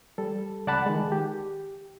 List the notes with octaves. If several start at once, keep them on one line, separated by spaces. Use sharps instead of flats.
G3 A4
C#2 D5 F#5 A5 B5 F#6
D#3 G#3
G4